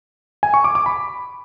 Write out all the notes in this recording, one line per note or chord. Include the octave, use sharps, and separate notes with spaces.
G#5
C#6
D6
D6
B5